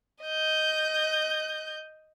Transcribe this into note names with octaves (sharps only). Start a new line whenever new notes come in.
D#5 G6